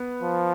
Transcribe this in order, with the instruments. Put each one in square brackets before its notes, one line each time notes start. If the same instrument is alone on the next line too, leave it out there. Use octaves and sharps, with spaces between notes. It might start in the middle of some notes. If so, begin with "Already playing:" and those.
Already playing: [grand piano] B3
[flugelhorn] F3